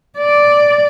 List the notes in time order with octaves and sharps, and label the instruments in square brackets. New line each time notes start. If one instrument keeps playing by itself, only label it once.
[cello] D5